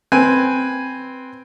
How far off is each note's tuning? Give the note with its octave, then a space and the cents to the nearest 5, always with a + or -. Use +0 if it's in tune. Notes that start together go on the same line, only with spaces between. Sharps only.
C4 +0 B4 +0 G#5 +0